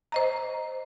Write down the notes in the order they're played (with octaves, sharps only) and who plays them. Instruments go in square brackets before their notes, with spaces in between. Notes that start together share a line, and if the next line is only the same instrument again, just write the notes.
[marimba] C5 D#5 A#5